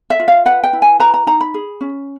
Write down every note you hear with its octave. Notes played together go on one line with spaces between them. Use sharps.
E5
F4
F5
B4 F#5
G5
E4
G#5
B4 A#5
A#5
D#4 A#5
B5
G#4
C#4